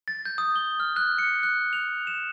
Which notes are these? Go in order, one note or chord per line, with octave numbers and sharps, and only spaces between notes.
A6
G6
D#6
G7
F6
F#6
C#7
F#6
F7
E7